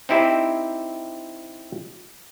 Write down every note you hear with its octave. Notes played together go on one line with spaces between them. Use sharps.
C4 D#4 E4 G4 C5